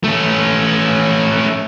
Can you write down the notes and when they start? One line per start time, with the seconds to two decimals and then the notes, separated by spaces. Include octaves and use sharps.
0.04 A3 C#4